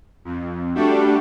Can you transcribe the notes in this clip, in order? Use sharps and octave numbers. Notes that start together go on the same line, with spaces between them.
F2
G3 A3 D4 F#4 G4 A4